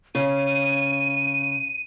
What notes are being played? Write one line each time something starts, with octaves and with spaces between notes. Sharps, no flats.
C#3 D#7